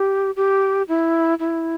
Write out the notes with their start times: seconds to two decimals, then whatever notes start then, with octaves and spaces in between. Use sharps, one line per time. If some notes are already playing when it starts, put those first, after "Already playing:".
Already playing: G4
0.36 G4
0.88 E4
1.40 E4